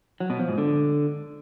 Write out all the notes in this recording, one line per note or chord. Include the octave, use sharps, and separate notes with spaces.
F#3
B2
F3
G#2
D3